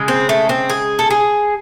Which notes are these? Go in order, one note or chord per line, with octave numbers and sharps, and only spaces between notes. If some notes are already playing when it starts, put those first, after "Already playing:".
Already playing: C#3 G#3
C4
A3
C4
G#4
A4
G#4